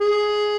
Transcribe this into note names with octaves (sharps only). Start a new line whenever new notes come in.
G#4